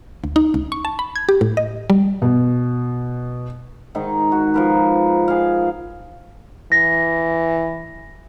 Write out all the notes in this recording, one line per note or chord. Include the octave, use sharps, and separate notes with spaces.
D2
D#4
C#2
C#6
A5
B5
G#6
G4
A2
D#5
G3
B2
G#2 D#3 D#4
F#4
F3 A#4 B4
G#4 F5
E3 A#6